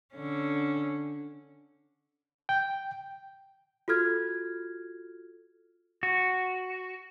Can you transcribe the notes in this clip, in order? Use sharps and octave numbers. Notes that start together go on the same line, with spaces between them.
D3 C#4
G5
F4 F#4 A4 F6 G#6
F#4